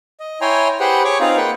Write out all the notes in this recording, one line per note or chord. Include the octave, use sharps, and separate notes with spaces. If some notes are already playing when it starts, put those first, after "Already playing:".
D#5
E4 C#5 G5 G#5 A#5 C6
G4 G#4 B4 C5 F#5 G5
G#4 C#5 C#6 D6
C4 D#4 F4 G#4 F5 A#5
A#3 B4 F#5 G5